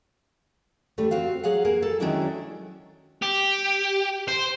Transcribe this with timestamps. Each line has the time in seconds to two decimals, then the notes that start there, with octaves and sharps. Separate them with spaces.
0.98 D3 G3 A3
1.11 C4 F#4 F5
1.44 F#3 G#4 F5 F#5
1.65 A#3 G#4 A#4
1.82 A4
2.00 D#3 F#3 G#3 C#4 D4 E4
3.22 G4
4.28 C5